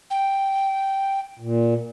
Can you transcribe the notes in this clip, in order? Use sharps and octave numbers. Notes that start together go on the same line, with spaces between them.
G5
A#2